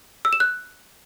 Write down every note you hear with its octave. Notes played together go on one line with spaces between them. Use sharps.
E6
E7
F#6